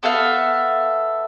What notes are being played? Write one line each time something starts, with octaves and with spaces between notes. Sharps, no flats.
B3 A4 E5 F5